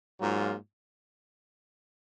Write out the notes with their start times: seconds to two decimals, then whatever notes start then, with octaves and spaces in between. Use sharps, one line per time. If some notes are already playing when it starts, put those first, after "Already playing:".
0.20 G#2 F#3 A#3 F4